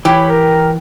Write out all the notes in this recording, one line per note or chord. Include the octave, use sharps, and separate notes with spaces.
E3 G4 C#5 B5
A#4